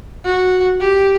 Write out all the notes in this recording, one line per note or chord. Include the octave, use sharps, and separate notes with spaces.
F#4
G4